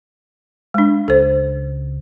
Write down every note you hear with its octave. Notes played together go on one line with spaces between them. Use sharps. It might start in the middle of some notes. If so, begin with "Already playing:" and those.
G#3 D4
C#2 A4 C5